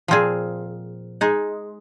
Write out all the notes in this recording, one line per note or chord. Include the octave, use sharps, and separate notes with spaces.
A#2 F3 C4 F4 G#4
G#3 D#4 G#4